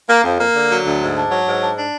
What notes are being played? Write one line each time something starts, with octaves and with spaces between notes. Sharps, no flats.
A#3
F2
A#3
D3
F#3
D2
G#2
D4
F#3
G#2
D4
D4